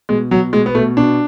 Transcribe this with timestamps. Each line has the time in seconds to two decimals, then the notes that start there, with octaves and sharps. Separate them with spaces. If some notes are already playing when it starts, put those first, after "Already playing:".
0.09 B2 G#3
0.31 B2 F#3
0.53 B2 G#3
0.66 B3
0.75 B2 A3
0.97 B2 D4